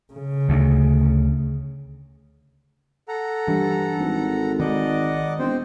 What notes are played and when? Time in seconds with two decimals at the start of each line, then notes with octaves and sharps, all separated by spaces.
0.13 C#3
0.49 D2
3.08 A4 F#5 A#5
3.48 G2 E3
3.99 G#1
4.60 D#3 G#3 D5 D#5 F#5
5.39 E1 C4 C5